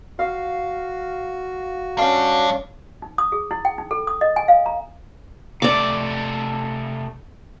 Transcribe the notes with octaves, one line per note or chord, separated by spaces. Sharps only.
F#4 F5
G3 C#4 D4 F5
D#4
D#6
G#4
E4
G5
D#4
A4
D#6
D#5
G#5
F5
A#5
C3 A3 D5 D6